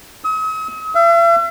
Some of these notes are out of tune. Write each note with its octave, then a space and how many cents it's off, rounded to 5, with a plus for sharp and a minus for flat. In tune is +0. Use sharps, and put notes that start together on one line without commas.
D#6 +45
E5 +45